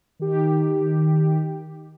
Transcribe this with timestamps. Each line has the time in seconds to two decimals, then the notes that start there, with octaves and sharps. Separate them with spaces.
0.19 D#3 G4